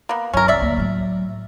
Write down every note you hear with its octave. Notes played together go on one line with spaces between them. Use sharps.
A#3 B3
G2 F#3 C#4 A#4
C2 D5 E5
D2 A#3
A2 F#3